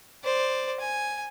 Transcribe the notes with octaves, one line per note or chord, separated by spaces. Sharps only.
C5 D5
G#5